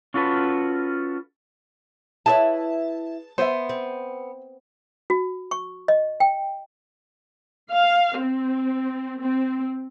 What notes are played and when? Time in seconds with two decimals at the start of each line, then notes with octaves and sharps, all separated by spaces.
0.14 C#4 F4 F#4 A4 B4
2.26 E4 G#4 B4 C#5 D#5 E5 A5
3.38 B3 C5 E5
3.69 C4
5.10 F#4
5.51 C#6
5.88 D#5
6.20 G5
7.71 F5
8.18 C4
9.20 C4